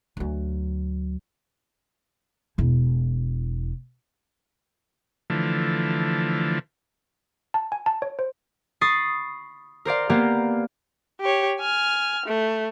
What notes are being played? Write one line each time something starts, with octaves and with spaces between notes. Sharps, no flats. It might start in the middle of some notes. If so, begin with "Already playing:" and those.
D2 F#3
E1 E4
D3 E3 F3 A3
A5
G#5
A5
C#5
C5
B5 C#6 D#6 A6 C7
A#4 C5 D5 F5
A#3 B3 G4 A#4
G4 C#5
G#5 F6
A3